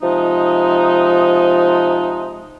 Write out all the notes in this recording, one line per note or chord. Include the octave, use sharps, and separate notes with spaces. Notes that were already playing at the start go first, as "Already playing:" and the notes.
C3 F3 G#3 D#4